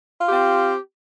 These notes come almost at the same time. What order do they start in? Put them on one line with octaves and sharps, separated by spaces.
F4 G4 C4